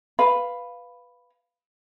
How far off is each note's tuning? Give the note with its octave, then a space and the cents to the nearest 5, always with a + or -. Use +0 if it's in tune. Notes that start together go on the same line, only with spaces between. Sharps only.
B4 +0 F5 +0 B5 +0